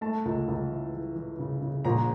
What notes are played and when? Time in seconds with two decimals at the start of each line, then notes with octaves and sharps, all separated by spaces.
0.01 A3 A5
0.25 C#2
0.48 C#2
0.71 E3
0.94 E3
1.16 E3
1.39 C#3
1.61 C#3
1.85 A#1 A#5